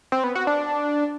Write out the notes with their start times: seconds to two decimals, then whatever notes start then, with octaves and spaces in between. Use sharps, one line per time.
0.12 C4
0.24 B3
0.35 F#4
0.47 D4